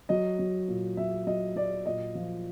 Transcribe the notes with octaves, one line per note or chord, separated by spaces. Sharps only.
F#3 D#5
F#3
A#2
F#3 E5
F#3 D#5
F#3 D5
A#2 D#5
F3